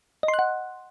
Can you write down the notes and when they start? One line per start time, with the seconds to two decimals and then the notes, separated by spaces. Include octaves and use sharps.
0.23 D#5
0.28 C6
0.34 F#6
0.39 F#5